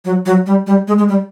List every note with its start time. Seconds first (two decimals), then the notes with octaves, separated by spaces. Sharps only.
0.05 F#3
0.26 F#3
0.46 G3
0.67 G3
0.88 G#3
0.98 G#3
1.08 G3